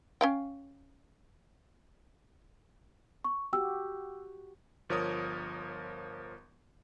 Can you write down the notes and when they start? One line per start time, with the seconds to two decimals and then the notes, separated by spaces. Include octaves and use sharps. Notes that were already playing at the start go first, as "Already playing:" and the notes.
0.21 C#4 F5 G5
3.25 C#6
3.53 F#4 G4 G5 E6
4.89 G1 F3 A#4 C#5 D#6